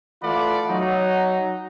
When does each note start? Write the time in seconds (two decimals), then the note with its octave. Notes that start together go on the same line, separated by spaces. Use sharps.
0.23 E3 A3 F4 D5 F#5 B5
0.69 F#3 D#4